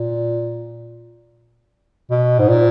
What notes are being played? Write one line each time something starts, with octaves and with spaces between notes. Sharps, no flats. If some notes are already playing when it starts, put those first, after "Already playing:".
Already playing: A#2
B2
G#2
A#2